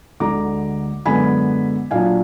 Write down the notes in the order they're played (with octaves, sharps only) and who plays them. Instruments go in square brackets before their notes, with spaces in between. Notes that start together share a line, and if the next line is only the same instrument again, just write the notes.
[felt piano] D2 D3 G#3 A#5 D6
F#2 D3 G#3 B3 G#5 B5
A#2 F#3 D4 F4 F5 G#5